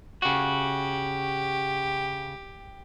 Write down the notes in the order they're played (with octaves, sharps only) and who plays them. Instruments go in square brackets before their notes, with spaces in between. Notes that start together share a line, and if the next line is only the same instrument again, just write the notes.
[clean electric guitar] C#3 F#4 [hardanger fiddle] G4